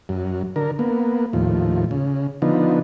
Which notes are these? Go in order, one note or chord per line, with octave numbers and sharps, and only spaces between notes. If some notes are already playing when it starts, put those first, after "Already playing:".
F#2
D3 A#4
A#3 B3
D#2 A2 F3
C#3
D3 F3 B3 D#4